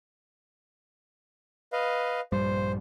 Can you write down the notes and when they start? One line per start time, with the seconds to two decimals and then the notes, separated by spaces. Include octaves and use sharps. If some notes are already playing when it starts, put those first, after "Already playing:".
1.73 B4 D#5 F5
2.32 A#1 G2 G3 C5